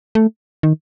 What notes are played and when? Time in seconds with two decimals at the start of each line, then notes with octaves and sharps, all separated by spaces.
0.15 A3
0.63 D#3